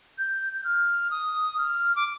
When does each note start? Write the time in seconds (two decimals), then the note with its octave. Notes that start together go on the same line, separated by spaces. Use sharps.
0.18 G6
0.53 G6
0.64 F6
1.11 D#6
1.58 F6
1.96 D6